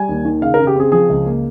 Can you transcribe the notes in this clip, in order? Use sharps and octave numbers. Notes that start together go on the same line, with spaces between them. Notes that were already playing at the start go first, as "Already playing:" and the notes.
Already playing: G3 G#5
D#2
D#3
C#3 F5
A#4
C#3
G4
C4 G#4
F3 G#4
C#2
A#3